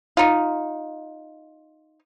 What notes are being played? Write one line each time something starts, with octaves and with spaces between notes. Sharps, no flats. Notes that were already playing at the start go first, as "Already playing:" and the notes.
D#4 F4